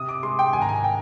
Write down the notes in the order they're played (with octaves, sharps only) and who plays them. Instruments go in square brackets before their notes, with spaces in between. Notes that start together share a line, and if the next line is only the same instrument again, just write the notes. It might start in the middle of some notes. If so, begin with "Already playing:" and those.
Already playing: [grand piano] C3 D#6
D6
G#3 C6
G5
G#1 G#5
A#5
G#5
G5